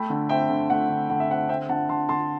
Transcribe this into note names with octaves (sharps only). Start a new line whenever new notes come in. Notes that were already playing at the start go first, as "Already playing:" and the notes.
Already playing: A3 G5 B5
D3
C4 E5 G5
D3
A3 F#5
D3
D3 F#5
E5
C4 F#5
C4 E5 G5
D3 F#5 A5
D3 A5 C6
D3 A5 C6